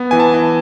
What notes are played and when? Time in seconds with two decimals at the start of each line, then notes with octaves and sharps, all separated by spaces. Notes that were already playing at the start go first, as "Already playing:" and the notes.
Already playing: B3
0.11 E3 G#5
0.20 A5
0.34 E3